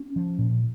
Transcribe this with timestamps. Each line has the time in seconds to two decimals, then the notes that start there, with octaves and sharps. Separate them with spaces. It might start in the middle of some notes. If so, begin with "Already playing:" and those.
Already playing: C#4
0.16 F3
0.38 A#2